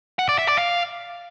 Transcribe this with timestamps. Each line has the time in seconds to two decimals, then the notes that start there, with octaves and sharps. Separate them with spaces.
0.19 F#5
0.29 D5
0.39 E5
0.48 D5
0.58 F5